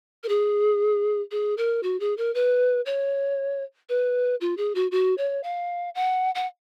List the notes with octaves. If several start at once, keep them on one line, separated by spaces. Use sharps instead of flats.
A#4
G#4
G#4
A#4
F#4
G#4
A#4
B4
C#5
B4
F4
G#4
F#4
F#4
C#5
F5
F#5
F#5